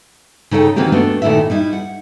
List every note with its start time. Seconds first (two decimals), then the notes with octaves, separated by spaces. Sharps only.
0.51 C#3 D#4 A4 F#5 G5
0.76 D#3 E3 A#3 C4 F#4 G4
0.92 A3 B3 D4 F#4
1.22 A#2 D#3 A3 E4 F#4 E5
1.50 G3 D#4 E4
1.73 F#5